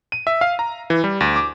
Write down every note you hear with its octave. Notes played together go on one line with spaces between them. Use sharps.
D#7
E5
F5
A#5
E3
G3
D2
D6